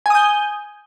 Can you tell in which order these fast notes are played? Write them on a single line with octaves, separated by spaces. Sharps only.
G#5 D#6 G6